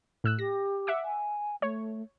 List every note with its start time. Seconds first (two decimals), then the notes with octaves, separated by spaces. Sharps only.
0.24 A2 E6 F#6
0.39 G4 A#6
0.87 E5 F#5 D6
1.04 G#5
1.62 A3 C#5